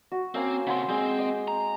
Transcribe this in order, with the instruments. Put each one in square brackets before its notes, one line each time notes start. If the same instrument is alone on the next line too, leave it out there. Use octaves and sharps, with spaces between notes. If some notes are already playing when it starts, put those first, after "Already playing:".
[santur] F#4
[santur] A#3 C#4 F5 [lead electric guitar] C4
[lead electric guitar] C#3 C4 [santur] F#5 C6
[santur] G#3 [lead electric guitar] C4
[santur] D#5
[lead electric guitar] A#5